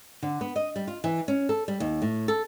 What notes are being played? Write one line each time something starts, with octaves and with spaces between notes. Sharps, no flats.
D3
B3
D#5
G3
F4
E3
C#4
A4
G3
D#2
A2
A4